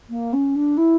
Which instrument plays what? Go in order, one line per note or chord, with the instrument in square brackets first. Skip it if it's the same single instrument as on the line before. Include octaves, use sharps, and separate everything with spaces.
[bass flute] A#3
C#4
D4
E4